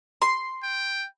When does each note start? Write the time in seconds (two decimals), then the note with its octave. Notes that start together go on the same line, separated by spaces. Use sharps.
0.22 C6
0.63 G5